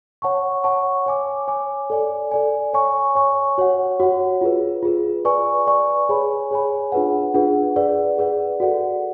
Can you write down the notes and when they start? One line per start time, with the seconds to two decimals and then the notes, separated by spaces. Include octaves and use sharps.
0.22 C#5 F#5 A5 C#6
0.64 C#5 F#5 A5 C#6
1.06 C#5 G#5 D6
1.48 C#5 G#5 D6
1.90 A4 D5 G#5
2.31 A4 D5 G#5
2.73 C#5 G#5 C#6
3.15 C#5 G#5 C#6
3.58 F#4 C#5 F#5
4.00 F#4 C#5 F#5
4.41 F4 G#4 B4
4.83 F4 G#4 B4
5.25 B4 D5 G#5 C#6
5.67 B4 D5 G#5 C#6
6.09 G#4 C#5 G#5 B5
6.51 G#4 C#5 G#5 B5
6.92 D4 F4 G#4 B4 F#5
7.34 D4 F4 G#4 B4 F#5
7.76 G#4 B4 D5 F#5
8.18 G#4 B4 D5 F#5
8.60 F#4 A4 D5 F#5